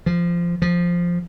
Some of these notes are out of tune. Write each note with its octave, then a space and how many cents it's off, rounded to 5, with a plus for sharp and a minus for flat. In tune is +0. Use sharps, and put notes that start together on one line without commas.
F3 -15
F3 +0